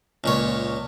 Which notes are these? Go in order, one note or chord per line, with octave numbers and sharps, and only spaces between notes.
C#2 A#2 C#5